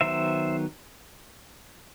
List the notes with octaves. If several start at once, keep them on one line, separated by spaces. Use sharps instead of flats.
D#3 F#3 B3 C5 E5